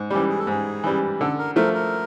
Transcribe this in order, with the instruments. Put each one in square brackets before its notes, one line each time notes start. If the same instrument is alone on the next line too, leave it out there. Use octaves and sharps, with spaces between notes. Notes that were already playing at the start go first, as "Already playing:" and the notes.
Already playing: [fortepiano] G#2
[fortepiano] E3 G3 [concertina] G4
[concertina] G#4
A4
[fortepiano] G#2 [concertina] G#4
[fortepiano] E3 G3
[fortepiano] D3 [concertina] A4
[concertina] A#4
[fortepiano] F3 A3 [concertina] A#4
[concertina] A#4